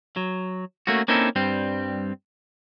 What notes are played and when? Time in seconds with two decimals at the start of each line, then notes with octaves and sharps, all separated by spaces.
0.16 F#3
0.87 A3 A#3 C#4 F#4
1.08 A#3 C4 C#4 D#4 E4 A4
1.36 G2 G3 C4